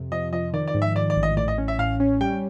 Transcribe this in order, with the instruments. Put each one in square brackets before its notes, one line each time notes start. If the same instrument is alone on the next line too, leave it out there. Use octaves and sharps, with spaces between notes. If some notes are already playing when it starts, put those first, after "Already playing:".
Already playing: [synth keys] F2 C3
[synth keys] F3 [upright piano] D#5
[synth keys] F3 [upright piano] D#5
[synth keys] D#3 [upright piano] D5
[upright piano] D5
[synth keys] G#2
[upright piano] E5
[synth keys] G#2 [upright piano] D5
[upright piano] D5
[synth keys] A1
[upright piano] D#5
[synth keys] A2 [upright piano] D5
[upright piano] D#5
[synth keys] C#4
[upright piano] E5
[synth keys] A2 [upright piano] F5
[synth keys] C#4
[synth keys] G3 [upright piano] G5